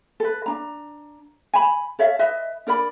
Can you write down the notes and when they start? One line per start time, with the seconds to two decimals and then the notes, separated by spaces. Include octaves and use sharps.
0.20 A4 B4
0.46 D4 A#5
1.54 G#5 B5
1.99 A4 C#5 E5 F5
2.19 B4 D#5 E5
2.67 D4 A#4 D5 B5